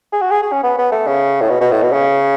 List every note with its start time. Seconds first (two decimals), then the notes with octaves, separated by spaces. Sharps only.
0.13 G#4
0.21 F#4
0.31 G#4
0.43 G#4
0.52 C#4
0.64 B3
0.78 B3
0.92 A3
1.07 C#3
1.42 A2
1.50 B2
1.61 B2
1.71 A2
1.83 B2
1.93 C#3